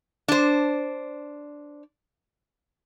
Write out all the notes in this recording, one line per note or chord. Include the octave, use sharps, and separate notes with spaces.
D4 C5